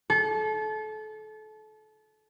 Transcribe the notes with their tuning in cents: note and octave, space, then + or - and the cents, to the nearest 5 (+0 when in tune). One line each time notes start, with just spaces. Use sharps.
A4 -30